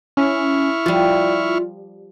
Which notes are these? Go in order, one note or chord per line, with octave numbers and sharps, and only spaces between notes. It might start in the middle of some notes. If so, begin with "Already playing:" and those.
C#4 E4 C#6 F6
F3 G3 F4